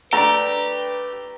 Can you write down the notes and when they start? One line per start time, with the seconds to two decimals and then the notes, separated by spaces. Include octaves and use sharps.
0.13 A3 D4 G4 B4 A#5